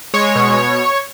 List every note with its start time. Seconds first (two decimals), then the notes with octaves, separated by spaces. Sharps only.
0.14 G#3 C#5
0.36 B2